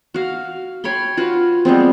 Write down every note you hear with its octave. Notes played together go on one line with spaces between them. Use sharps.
F#4 F5
C#5 G5 B5 C6
F4 F#4 B4
G3 G#3 B3 C4